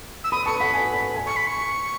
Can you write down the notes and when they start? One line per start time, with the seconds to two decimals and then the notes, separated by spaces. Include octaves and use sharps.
0.24 E6
0.32 B5 D#6
0.46 A5 C#6
0.59 F#5 B5
0.74 G#5
0.94 A5
1.16 G#5
1.27 C#6
1.36 B5
1.47 C#6